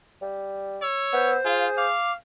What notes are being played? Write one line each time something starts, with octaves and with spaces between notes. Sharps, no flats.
G3
C#5 E6
B3 C5
F4 G#4 F5
F5 D6